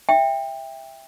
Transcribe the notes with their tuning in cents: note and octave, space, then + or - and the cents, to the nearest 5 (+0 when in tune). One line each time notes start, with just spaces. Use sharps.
E5 +0 G5 +20